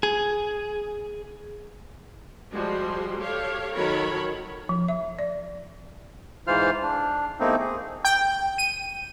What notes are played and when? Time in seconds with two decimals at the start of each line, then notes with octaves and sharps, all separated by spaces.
0.03 G#4
2.53 F3 G3 G#3 F#4 C6
3.20 G4 A4 C#5 F5
3.76 D#3 F#3 A4 A#4 C#5 B5
4.69 F3
4.88 E5
5.19 D5
6.47 G#2 E3 F4 C5 F5 F6
6.83 D4
7.40 E2 A3 A#3 C4 D#4
7.60 G#4
8.05 G5
8.58 D#7